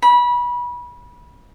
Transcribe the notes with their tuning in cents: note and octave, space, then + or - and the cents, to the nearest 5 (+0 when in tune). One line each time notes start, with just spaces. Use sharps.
B5 -25